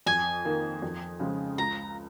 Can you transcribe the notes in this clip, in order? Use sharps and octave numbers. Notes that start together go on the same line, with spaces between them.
F2 G#5
D#3 A#3
F2
C#3 F3 G#3
C#2 A#5